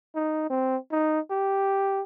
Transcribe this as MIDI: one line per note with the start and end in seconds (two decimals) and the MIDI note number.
0.15 0.46 63
0.50 0.76 60
0.92 1.20 63
1.30 2.02 67